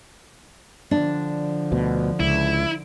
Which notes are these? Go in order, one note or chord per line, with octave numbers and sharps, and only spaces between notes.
D3 F3 D4
D2 B2
C#2 E4